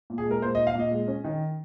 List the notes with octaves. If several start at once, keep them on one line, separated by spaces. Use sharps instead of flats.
A#2
G#4
G#3 A#4
A#2 C5
D#5
D#4
F5
A#2 D#5
G#3
C#4
D#3